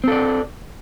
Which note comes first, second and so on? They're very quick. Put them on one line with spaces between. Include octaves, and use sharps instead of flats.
C4 A4 D5